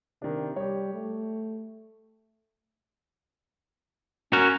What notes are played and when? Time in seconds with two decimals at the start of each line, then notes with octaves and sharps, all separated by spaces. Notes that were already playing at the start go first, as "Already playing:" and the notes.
0.22 C3 D#3 D4
0.56 G3 G4 C#5
0.94 A3
4.33 C#4 F#4 A#4